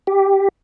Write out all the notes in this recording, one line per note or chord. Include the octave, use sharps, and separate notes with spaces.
G4